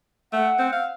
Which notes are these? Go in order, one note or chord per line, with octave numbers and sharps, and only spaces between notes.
A3 F#5
C4
F5